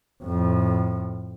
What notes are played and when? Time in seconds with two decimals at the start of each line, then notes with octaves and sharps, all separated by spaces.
0.23 F2 A2